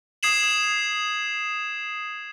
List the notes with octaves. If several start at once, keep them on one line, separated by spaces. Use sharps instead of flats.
D#6 G#6 C7 E7 F#7